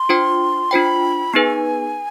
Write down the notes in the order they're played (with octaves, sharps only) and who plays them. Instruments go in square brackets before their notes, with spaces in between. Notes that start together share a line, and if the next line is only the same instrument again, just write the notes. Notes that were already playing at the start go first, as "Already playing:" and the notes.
Already playing: [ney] C6
[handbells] D4 F4 C5 G5
[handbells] D4 F4 C5 G5 [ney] B5
[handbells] B3 D#4 G#4 B4 [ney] G#5